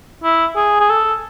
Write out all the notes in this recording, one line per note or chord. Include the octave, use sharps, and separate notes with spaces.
E4
G#4
G#4
A4